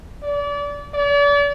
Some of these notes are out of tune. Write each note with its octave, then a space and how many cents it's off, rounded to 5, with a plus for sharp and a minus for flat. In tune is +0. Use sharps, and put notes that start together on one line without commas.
D5 -30
D5 -40